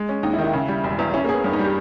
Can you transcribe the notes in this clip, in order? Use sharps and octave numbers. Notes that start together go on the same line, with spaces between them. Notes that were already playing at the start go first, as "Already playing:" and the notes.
Already playing: G#3
C#4
D#2 D#4
E4
D#3
E4
C#3
G3
E1
E2
C#4 E4
A#3
B3 G#4
G2 B3
D#4
G3 G4